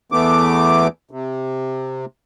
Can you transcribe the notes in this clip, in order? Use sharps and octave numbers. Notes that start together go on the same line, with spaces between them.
E2 E3 A3 B3 D6
C3